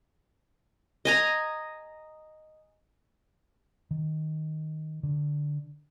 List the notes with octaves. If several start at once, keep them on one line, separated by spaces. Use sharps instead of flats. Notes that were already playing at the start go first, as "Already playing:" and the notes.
D#5 G#5 A#5
D#3
D3